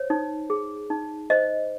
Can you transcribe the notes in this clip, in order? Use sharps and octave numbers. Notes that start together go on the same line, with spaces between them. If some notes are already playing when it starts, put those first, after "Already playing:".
Already playing: C5 C#5
D#4
G#4
D#4
C5 D#5